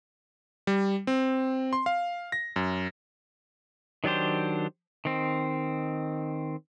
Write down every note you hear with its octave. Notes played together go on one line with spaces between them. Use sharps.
G3
C4
C6
F5
A#6
F#2
D#3 F#3 D4 G4 C5
D#3 C4